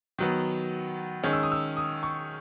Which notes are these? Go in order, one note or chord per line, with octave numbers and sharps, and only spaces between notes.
D#3 F#3 B3
D#3 G#3 C#4
E6
D#6
E6
D#6
C#6